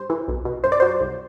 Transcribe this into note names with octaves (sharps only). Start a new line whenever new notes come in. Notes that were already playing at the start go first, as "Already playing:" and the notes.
Already playing: G2 C5
E3
B1
B2
F#2 C5
D5
F#3 C5
C2